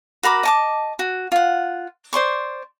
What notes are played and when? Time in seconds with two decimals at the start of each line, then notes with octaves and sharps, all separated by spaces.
0.23 F#4 A#4 B5 D6
0.43 D#5 A5 D6
0.99 F#4
1.32 F4 F#5
2.13 C5 D5 C6 C#6